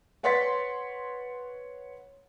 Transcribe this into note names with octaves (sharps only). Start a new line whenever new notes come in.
B4 C#5 F#5 C6 A6 B6